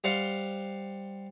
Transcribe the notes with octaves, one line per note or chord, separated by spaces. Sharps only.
G3 C5 F5 F#5